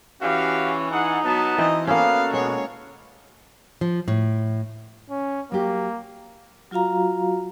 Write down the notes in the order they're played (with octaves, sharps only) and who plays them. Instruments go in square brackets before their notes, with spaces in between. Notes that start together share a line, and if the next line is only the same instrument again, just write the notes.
[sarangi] E3 [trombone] C#4 [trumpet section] F#4 G4 F5
[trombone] D#4 [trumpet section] G#4 F#5
[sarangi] F#3 [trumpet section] B3 A5
[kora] E3 C4 [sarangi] D#5
[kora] A#3 C#4 [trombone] B3 [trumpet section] F#4 A4 [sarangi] F5
[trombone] B2 [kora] G#3 [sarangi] C#5
[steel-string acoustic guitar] F3
A2
[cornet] C#4
[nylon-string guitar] F#3 G4 [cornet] A#3
[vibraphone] F#3 F4 F#4 F5 A#5